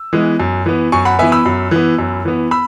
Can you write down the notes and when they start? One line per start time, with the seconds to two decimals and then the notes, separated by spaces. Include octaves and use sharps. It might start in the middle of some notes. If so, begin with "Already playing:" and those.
Already playing: E6
0.13 E3 G#3 B3
0.40 F#2
0.66 E3 B3
0.92 F#2 G#5 C#6
1.05 F#5 B5
1.19 E3 B3 E5 G#5
1.32 B5 E6
1.46 F#2
1.71 E3 B3
1.99 F#2
2.25 E3 B3
2.51 B5 E6